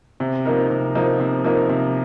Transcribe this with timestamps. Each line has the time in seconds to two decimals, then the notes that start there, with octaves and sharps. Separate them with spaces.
0.20 C3
0.45 F3 A#3 D#4 A#4
0.70 C3
0.95 F3 A#3 D#4 A#4
1.19 C3
1.44 F3 A#3 D#4 A#4
1.69 C3